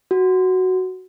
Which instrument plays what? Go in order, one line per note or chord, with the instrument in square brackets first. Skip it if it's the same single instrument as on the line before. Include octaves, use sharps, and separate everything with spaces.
[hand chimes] F#4